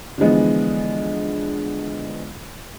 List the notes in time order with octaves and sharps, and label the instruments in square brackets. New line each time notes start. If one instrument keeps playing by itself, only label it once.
[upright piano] D3 E3 F3 G#3 B3